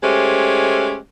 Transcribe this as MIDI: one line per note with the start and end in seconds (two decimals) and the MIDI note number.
0.02 0.97 56
0.02 0.97 57
0.02 0.97 61
0.02 0.97 67
0.02 0.97 72